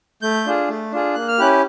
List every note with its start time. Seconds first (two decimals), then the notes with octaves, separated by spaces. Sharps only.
0.22 A3 G6
0.46 D4 F4 G#4
0.69 A3
0.92 D4 F4 G#4
1.15 A#3 F#6
1.28 F6
1.38 C#4 E4 G4 F#6